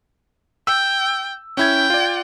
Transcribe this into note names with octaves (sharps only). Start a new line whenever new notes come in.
G5 E6
C#4 E4 G5 G#6
F4 D5